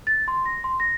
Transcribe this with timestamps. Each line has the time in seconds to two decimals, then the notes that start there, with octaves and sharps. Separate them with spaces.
0.07 A6
0.28 C6
0.46 A#6
0.64 C6
0.80 A#6